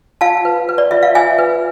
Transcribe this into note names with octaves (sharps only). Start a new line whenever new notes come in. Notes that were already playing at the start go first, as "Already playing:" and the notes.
F4 F5 A5
B4
B4
D5
F4 E5
F5
F4 E5 G#5
B4